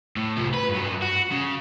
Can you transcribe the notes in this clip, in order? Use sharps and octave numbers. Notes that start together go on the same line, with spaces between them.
A2
C2 F3
B4
G2 F#3
F#4
C#3